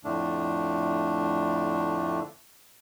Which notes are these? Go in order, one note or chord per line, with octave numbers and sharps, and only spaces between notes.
F2 A2 D3 A3 D4